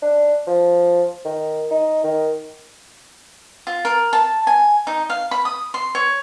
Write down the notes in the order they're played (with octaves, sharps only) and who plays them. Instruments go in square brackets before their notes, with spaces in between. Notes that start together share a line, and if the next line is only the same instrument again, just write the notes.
[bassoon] D4
F3
D#3
D#4
D#3
[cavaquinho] F4
A#4
A5
G#5
D#4
F5
B5
D#6
C6
C#5